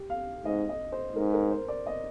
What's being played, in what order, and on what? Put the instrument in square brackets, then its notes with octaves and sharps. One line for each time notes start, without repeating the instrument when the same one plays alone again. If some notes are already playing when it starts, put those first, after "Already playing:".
Already playing: [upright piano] G4
F5
[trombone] G#2 [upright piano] D#5
[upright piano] D#5
C5
[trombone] G#2 [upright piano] A#4
[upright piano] A#4
C5
D5
D#5